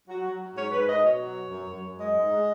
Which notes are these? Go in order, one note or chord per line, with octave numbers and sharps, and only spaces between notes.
F#3 F#4
F#3
F#3
G#2 C#5
G#2 B4
G#2 D#5
B2 C#5
F#3
F#3
F#2
F#2
F#2
G#3 D#5
G#2
G#3